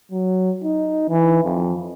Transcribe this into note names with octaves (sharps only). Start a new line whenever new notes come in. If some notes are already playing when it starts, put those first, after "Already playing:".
F#3
D#4
E3
F2